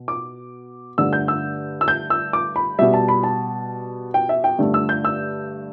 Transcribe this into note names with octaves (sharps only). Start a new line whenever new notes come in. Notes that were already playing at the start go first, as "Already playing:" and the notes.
Already playing: B2
D6
G2 D3 A3 E6
G6
E6
E6
G6
E6
D6
B5
B2 G3 E5
A5
B5
A5
G5
E5
G5
G2 D3 A3
E6
G6
E6